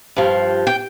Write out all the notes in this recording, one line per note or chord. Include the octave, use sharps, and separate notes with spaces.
G2 F3
G5